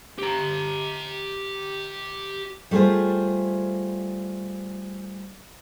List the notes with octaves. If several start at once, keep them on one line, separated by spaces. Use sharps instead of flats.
G4 A#5
G3 A3 F4 G#4 C5